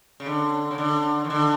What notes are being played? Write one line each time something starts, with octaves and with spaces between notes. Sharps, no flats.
C#3
D3
C#3
D3
D#3
D3